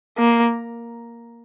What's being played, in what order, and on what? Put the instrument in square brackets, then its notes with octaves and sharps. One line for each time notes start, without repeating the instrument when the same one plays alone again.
[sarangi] A#3